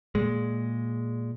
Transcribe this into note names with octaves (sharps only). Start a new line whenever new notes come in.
A#2 G#3